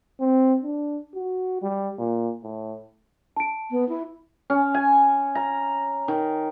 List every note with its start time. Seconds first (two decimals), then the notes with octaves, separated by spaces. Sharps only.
0.20 C4
0.63 D4
1.15 F#4
1.62 G3
1.98 A#2
2.43 A2
3.36 A5 D7
3.71 B3
3.89 E4
4.50 C#4
4.74 G#5
5.35 A#5
6.08 D#3